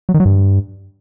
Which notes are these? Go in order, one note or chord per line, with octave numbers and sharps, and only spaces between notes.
F#3
D#3
F#3
G2